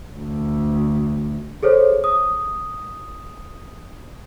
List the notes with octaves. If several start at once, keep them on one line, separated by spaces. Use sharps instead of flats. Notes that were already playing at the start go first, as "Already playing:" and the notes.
D2
G#4 A4 C5 C#5
D#6